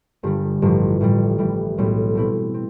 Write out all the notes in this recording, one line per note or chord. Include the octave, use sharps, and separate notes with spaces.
G1 G2 D3 G3
A1 G2 F3
A1 A2 E3 G3
A2 E3 G3
B1 A2 G3
B2 A3 C4 E4
C4